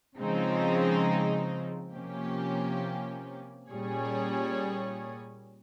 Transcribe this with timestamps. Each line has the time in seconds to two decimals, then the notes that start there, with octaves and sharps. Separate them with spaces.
0.18 C#3 F3 G#3 C4 D#4
1.94 C3 F3 A#3 C#4 G4
3.71 A#2 G3 C#4 G#4 C#5